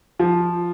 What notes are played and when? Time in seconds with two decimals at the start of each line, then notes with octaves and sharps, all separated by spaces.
0.19 F3